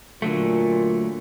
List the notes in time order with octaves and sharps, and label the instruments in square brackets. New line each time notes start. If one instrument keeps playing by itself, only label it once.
[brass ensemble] A#2 [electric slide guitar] D3 F#3 A3